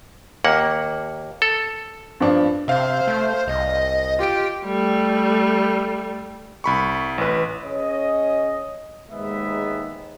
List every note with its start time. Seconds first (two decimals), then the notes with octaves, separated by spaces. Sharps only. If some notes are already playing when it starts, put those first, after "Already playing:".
0.44 D#2 A#3 F#5
1.42 A4
2.20 G2 F3 D4
2.68 C3 C5 E5 F5
3.07 A3
3.47 C2 D#5
4.19 F4 G4 D7
4.65 G3 A3
6.64 C2 B5 C#6
7.18 A1 B4
7.64 C#4 G#4 C#5 D#5
9.11 D#2 G#2 G#3 B3 E5